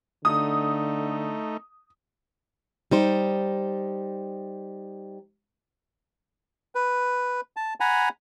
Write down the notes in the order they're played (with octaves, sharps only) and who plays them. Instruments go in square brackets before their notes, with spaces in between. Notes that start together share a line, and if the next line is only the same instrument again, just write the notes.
[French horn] D3 [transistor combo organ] A3 D#4 [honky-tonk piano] D#6
[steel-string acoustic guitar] G3 D#4 C5
[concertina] B4
A5
F#5 G#5 A#5 B5